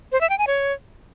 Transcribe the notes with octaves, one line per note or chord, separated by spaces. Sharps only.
C5
E5
G5
G#5
C#5